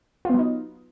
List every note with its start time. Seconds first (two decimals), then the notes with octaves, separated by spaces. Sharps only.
0.25 F4
0.30 B3
0.34 F#3
0.39 D#4